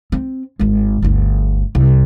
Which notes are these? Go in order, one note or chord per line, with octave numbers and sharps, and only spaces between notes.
C4
G#1 G#3
G1 D2
C2